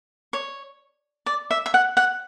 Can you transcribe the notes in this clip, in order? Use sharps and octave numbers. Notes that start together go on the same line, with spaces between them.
C#5
D5
E5
E5
F#5
F#5